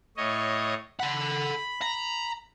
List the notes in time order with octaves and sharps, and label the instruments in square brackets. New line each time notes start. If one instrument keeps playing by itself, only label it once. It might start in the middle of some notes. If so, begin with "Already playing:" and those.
[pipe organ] A2 C#5 D#5
[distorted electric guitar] A4 F#5 [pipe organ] B5
[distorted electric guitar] A#5